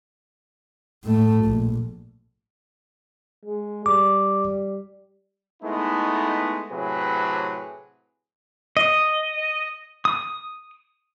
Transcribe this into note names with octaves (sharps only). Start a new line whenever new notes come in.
A2 A3
A#1
G#3
G3 D6
G#3 A3 B3 D#4 E4
A2 C3 F#3 G#4 B4
D#5
D#6